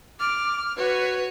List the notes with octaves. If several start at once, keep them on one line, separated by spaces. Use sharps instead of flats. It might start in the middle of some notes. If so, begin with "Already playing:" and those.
D6 F6
F#4 B4 C#5